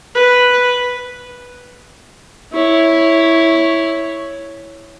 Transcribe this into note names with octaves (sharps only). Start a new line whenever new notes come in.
B4
E4 C#5